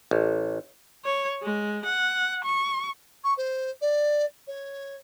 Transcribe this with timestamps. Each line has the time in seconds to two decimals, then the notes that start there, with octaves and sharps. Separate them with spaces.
0.11 A1
1.05 C#5
1.42 G#3
1.85 F#5
2.44 C#6
3.24 C#6
3.37 C5
3.81 D5
4.47 C#5